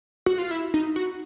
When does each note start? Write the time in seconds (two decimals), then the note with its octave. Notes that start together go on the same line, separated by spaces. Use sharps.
0.26 F#4
0.38 F4
0.51 E4
0.74 D#4
0.96 F#4